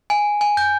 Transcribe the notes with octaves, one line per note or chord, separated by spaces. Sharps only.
G#5
G#5
G6